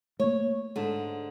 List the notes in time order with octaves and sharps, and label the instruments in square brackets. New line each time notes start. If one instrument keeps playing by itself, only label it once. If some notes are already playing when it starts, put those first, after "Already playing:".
[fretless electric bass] A3 A#3 [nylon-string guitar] C#5
[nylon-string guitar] G#2 D3